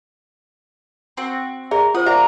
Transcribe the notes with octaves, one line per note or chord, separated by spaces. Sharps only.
C4 F#4
G#4 A#4 D5 E5
F4 C5 F#5 D#6
A#3 D4 G4 E5 F#5 A#5